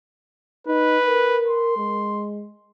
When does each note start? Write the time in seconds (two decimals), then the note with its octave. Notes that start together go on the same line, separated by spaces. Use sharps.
0.67 D#4 B4
1.06 A#4
1.48 C6
1.78 G#3